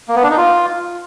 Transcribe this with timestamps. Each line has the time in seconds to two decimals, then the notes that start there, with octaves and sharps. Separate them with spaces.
0.08 A#3
0.16 B3
0.23 D4
0.30 D#4
0.38 F4